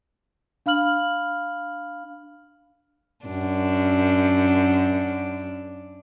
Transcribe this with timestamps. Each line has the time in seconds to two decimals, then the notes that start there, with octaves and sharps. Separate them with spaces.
0.66 D4 F5 B5 F6 F#7
3.26 F#2 D4